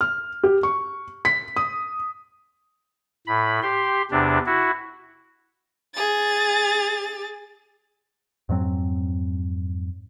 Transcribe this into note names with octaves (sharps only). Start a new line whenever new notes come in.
F6
G4
C#6
B6
D#6
A2 B5
G4 C6
E2 C3 D4
E4 F#4
G#4 A6
F2 G#2 F#3 C4